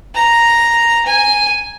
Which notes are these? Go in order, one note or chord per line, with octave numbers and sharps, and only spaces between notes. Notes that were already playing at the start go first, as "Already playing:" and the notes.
A#5
G#5